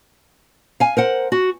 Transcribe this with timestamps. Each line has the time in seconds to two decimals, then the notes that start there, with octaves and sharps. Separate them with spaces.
0.80 F5 G#5
0.97 A#4 C5 F#5
1.32 F#4